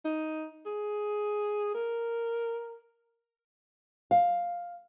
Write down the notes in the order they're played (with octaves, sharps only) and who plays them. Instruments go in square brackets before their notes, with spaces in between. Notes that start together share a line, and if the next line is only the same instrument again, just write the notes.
[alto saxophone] D#4
G#4
A#4
[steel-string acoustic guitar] F5